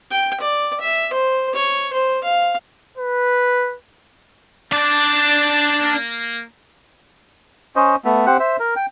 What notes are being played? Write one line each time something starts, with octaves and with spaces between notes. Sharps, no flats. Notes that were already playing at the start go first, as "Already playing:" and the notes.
G5
D5
E5
C5
C#5
C5
F5
B4
G3 C4 D4 D5 A5
A#3
C#4 C5 D#5
A3 B3
C4 G4 C5 F#5
C5 E5
A#4
G5